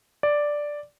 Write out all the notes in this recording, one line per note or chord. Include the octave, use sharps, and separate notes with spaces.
D5